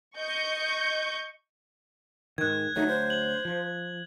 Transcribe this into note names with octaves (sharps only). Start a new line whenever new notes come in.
D#5 C#6 G6
G#2 D#3 F#6 G#6
D2 F#3 A3 D#4
C5
F#7
F3